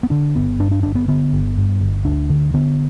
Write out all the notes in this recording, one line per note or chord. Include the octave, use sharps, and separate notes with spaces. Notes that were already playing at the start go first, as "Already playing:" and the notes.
B3
D3 D4
G1 B3
G2 D4
D4
G1 D4
B3
D3 B3
G1
G2
G1
D2 D4
D3
D3 B3